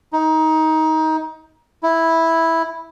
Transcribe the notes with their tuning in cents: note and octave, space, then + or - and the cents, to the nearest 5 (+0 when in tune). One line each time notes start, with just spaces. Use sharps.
D#4 +20
E4 -5